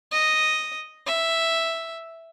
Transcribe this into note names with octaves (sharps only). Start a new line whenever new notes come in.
D#5
E5